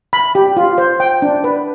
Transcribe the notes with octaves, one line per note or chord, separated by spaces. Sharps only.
B5
G4
F4
C5
G5
D4
B4